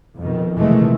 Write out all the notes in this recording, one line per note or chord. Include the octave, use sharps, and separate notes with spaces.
F2 B2 D#3
F1 B2 D#3 E3 G#3 A3